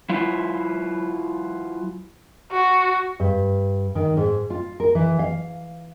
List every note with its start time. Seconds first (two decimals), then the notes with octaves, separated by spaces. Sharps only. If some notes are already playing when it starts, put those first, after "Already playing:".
0.09 F#3 E4 F4
2.52 F#4
3.20 G2
3.95 D#3
4.17 G#2
4.50 F4
4.80 A#4
4.95 E3
5.19 F5